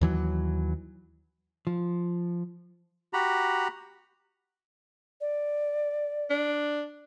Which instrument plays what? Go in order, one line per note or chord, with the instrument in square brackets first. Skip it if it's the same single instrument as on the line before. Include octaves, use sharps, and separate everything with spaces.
[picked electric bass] D#2 E3 F#3
[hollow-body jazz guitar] F3
[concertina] F#4 G4 A#5 B5
[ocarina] D5
[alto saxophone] D4